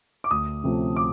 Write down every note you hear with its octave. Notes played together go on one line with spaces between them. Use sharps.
D6
D2 D#6
C3 F3 A3 C#4
D6